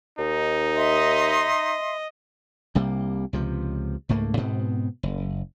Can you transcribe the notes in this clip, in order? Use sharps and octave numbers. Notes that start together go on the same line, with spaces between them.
D#2 D#4
D#5 E5 C6
C2 C3 G3 A#3
C#2 C3 F3
C#2 G#2 A3 A#3
G#2 B2 B3 C4
F#1